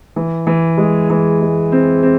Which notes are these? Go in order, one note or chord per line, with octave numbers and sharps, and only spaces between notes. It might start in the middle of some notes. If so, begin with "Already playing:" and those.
E3
E3
G#3
E3
G#3
C4
C4